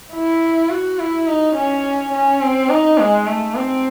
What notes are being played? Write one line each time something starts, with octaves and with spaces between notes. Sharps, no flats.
E4
F#4
E4
D#4
C#4
C#4
C4
D#4
G#3
A3
C4